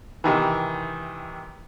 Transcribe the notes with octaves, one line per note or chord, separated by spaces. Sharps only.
C3 D#3 E3